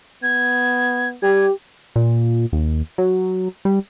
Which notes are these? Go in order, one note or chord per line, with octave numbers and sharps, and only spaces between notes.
B3 G#6
G3 G4 G#6
A#2
D#2
F#3
G3